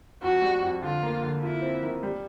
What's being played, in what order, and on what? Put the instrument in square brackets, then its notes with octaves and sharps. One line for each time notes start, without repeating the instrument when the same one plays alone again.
[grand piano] F2 [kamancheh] F#4
[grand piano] G3
F2
[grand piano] D3 [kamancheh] F4
[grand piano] A#3
D3
[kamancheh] E4 [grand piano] F4
[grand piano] C4
D#3
G3